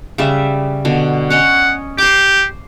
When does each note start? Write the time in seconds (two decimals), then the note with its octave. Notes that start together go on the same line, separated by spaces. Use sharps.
0.18 C#3 G3 E5
0.85 B2 D3
1.30 C#4 C#5 D#5 F#5
1.98 G4 C5 D6